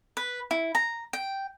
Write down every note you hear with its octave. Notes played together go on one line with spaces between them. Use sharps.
B4
E4
A#5
G5